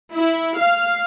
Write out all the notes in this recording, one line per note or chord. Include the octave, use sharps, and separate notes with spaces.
E4
F5